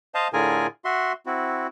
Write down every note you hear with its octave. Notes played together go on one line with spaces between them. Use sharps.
C5 D#5 F5 A5
A2 D3 F4 G#4 A#4 G#5
F#4 E5 C6
C4 E4 F#4